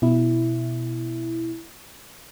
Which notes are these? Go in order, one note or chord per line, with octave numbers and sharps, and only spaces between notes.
B2 E4